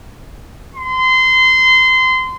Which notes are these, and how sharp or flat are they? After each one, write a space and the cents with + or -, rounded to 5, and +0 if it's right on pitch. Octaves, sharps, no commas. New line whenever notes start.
C6 -25